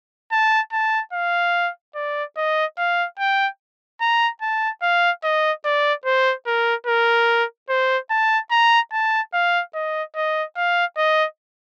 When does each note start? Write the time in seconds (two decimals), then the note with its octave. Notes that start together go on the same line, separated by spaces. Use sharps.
0.32 A5
0.72 A5
1.13 F5
1.95 D5
2.37 D#5
2.78 F5
3.19 G5
4.01 A#5
4.41 A5
4.82 F5
5.23 D#5
5.65 D5
6.05 C5
6.46 A#4
6.87 A#4
7.69 C5
8.10 A5
8.51 A#5
8.92 A5
9.33 F5
9.74 D#5
10.15 D#5
10.56 F5
10.97 D#5